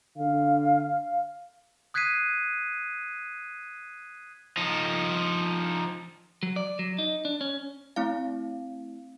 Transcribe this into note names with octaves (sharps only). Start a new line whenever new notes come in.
D3 F5
D#6 F#6 G#6 B6 C7 D#7
F3 D#4
F#3
D5
F#3
D#4
D4
C#4
A3 C4 E4 F5